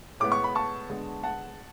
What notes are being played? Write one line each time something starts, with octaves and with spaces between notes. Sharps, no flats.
A2 G#3 B3 D6
C#6
B5
A5 C#6
D3 G#3 B3
F#5 A5